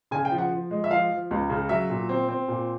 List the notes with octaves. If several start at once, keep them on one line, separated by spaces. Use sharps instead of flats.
C#3 G#5
G5
F3
F#5
F3
G#3
E5
F3 F5
F3
C#2
C#3
F#3 E5
A#2
C4
C4
A#2